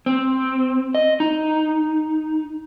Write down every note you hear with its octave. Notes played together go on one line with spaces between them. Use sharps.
C4
D#5
D#4